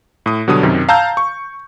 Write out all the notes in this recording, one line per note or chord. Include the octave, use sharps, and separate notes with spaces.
A2 D#6
B2 D3 F#3 G3 D#6
F#2 C3 D#3
F5 A5 A#5 E6 G6
C#6